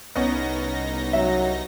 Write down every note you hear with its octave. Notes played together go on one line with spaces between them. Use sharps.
C2 B3 C#4 D#4 A#6
F#3 E5